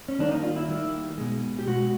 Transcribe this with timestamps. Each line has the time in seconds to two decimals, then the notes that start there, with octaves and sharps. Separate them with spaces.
0.08 C#4
0.19 D#3 G3 A#3 D4
0.32 D#4
0.43 F4
0.56 E4
0.69 D#3 G3 A#3
1.18 B2 G#3
1.59 G4
1.67 B2 G#3 F#4